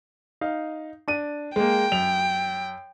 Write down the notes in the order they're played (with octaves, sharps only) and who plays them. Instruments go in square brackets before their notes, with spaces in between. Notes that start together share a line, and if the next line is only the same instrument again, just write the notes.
[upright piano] D#4 F5
D4 D#7
[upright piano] G#3 A#3 [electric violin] G5
[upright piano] F#2 F7